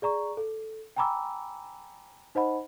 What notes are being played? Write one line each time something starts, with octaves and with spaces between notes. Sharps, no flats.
G#4 D5 A#5 C#6
A4
G5 G#5 A#5 B5 D6 E6
D#4 C5 D#5 F#5 B5